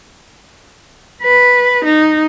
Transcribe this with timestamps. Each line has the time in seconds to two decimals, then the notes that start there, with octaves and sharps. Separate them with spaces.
1.22 B4
1.84 D#4